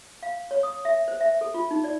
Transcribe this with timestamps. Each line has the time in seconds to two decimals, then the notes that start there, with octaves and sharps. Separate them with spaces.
0.23 F5
0.51 C#5
0.63 D#6
0.85 E5
1.08 C5
1.21 E5
1.41 A4
1.54 F4
1.71 D#4
1.84 D5